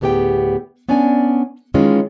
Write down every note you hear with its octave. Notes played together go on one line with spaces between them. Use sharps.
D2 A2 B3 G4 G#4 G5
B3 C#4 D4 D5 G#5
D#3 E3 G#3 C#4 F4